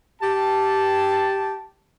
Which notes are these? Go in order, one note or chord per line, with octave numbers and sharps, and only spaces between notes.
G4 A5